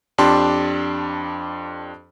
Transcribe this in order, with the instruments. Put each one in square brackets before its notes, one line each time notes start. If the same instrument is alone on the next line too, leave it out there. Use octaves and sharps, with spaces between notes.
[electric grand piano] F2 D4 G4 A5 C6